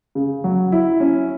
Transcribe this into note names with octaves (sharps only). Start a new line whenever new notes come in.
C#3
F#3
E4
C#4